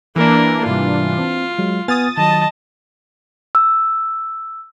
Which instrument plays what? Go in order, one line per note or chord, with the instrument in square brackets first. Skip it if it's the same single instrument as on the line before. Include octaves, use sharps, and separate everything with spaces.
[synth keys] E3 D4 [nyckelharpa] A#3 A#4
[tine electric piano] G#2 C3 G3 [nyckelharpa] F4
[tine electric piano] C4
F#3 G#3
[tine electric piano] B3 G#5 F6 [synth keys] D#6 A6
[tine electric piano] D#3 F#3 [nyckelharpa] D#5 A5
[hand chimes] E6